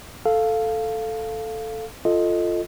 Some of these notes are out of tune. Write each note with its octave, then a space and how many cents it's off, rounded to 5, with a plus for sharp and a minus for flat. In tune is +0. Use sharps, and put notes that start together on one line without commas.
A4 +0 F5 +0
F4 +0 A4 +0 D#5 +0